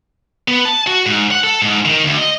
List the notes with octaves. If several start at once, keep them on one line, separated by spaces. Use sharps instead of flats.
B3
A5
F#4
G#2
F#5
A4
G#2
D#3
D2
D#5